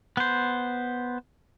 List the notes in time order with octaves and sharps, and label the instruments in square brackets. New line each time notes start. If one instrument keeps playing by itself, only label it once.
[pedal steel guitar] B3 C5